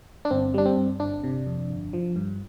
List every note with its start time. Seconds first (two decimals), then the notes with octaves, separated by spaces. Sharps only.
0.25 D4
0.31 G1 C4
0.54 G3 D4
0.65 C4
0.77 G2
1.00 G1 D4
1.24 C3
1.47 F2
1.70 G1
1.93 F3
2.16 G2